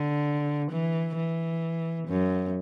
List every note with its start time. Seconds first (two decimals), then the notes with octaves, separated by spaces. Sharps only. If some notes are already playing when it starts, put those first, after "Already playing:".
Already playing: D3
0.71 E3
1.17 E3
2.08 F#2